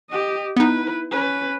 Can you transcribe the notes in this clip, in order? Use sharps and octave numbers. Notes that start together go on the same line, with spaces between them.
G4 D#5
B3 D#4 E4 B4
C#4 B4